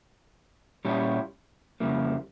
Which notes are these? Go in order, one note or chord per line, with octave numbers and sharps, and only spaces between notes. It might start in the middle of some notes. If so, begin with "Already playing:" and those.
A#2 G3 C#4 E4 G4
F2 C#3 G3 A#3 E4